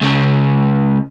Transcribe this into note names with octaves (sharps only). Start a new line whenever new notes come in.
C#2 C#3